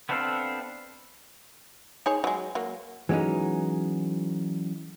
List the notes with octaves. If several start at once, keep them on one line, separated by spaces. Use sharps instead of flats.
B3 C4 D4 A4 F5
D#4 G#4 C#5
F#3 G#3
F#3 A#3
E3 F#3 G#3 C#4 D#4